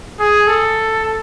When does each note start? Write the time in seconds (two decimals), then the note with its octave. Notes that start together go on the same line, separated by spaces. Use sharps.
0.20 G#4
0.48 A4